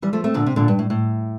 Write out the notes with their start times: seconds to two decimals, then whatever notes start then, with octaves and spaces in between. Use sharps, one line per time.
0.02 E3 G3
0.13 F3 A3
0.24 A3 C4
0.34 A#2 D3
0.46 C3
0.56 A#2 D3
0.68 G2
0.79 A2
0.90 A2